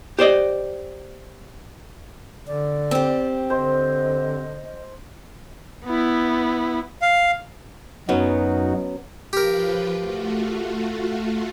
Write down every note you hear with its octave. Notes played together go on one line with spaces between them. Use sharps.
G4 C5 D5 D#5
D3 D5
C4 G4
D3 C5 D#5
B3 E4
F5
F#2 F#3 B3 C#4 D#4 F#4
F3 F4 G4 A#4 B4
A3 F4 F#4